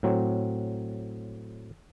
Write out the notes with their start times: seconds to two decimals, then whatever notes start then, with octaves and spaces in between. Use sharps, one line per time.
0.03 A2 F#3 C4